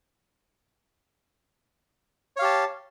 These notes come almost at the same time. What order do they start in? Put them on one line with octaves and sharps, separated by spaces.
C#5 F5 G4 A5